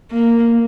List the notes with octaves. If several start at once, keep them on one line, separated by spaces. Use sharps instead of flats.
A#3